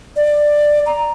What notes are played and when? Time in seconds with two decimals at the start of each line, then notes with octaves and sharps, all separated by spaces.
0.16 D5
0.86 A#5